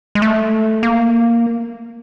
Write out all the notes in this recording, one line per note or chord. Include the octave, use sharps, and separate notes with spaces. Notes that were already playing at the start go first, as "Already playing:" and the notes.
G#3
A3
A#3